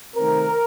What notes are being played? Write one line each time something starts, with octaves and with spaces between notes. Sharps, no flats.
C3 D#3 A3 C4 A#4